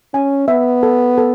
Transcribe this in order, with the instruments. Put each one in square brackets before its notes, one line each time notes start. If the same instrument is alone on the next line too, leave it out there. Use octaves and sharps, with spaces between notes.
[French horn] C#4 [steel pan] G#5
[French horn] B3 [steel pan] E5
[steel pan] A4
A4